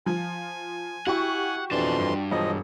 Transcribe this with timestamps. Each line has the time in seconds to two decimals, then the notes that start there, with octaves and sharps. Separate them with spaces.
0.06 F3 G#5
1.07 E4 F#4 G4 F#5 C#6
1.71 F2 B2 E3 D4 A5 C6
1.98 G2
2.31 E1 F3 D#5